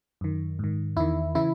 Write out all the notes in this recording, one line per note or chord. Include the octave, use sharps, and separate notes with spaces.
F#2 D#3
G#2 D#3
E2 D#3 E4
C#3 E3 E4